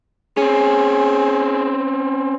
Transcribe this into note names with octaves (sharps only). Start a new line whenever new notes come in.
C4 C#4 G#4